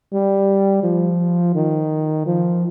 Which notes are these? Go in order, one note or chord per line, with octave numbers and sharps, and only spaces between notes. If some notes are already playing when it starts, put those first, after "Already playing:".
G3
F3
D#3
F3